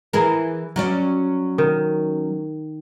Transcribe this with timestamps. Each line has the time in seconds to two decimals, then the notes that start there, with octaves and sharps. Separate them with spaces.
0.13 E3 G#4 A#4
0.76 F#3 C#4 D5
1.58 D#3